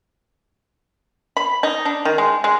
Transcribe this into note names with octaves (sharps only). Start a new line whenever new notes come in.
B5
D#4
D4
D#3
G#3
G#3